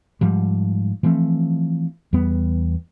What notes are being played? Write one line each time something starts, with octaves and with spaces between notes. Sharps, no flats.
G#2 F3 G3
E3 F3 A3 C4
E2 G3 B3